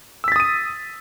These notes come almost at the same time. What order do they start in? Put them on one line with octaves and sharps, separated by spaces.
E6 B6 A6 D#6 D#7